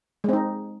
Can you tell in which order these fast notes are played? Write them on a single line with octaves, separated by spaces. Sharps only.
G#3 C4 D#4